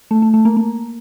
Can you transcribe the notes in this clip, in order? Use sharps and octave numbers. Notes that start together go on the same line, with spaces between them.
A3
A3
A3
A#3
A#3